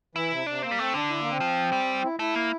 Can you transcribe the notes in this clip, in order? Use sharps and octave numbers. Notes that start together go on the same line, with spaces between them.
E3 E4
C3
C3 D4
A#3 C4
G3
A3 C4
D3 D4
E4
A#3
C4
F3
G3
E4
A3 E4
A#3